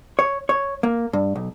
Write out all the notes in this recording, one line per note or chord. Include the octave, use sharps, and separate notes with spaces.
C#5
C#5
A#3
G2
B1